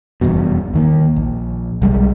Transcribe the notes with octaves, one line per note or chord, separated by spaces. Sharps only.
F1 E2 G2 B2
D#2 D#3 A#3
A#1
B1 G3 G#3